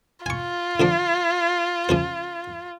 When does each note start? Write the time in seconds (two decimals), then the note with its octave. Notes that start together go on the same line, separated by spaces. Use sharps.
0.26 F4 G#5 C#6
0.80 D3 F3 D4
1.89 C#3 F3 C5